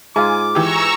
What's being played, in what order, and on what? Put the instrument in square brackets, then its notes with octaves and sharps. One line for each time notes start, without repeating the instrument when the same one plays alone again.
[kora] G#2 F4 [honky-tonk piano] G#5 [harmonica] D6
[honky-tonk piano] E3 G4 [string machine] A#5 C#6 E6